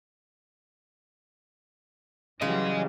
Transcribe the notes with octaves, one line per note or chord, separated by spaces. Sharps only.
C#3 E3 F#3 G3 D#5 G#5